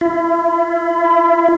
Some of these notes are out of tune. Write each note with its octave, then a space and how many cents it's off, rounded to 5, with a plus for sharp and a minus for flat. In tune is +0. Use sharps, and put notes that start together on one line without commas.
E4 +35